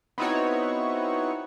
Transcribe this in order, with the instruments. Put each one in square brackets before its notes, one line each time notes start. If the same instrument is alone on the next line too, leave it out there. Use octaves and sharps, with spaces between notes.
[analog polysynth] B3 C4 D#4 E4 F#4 C#5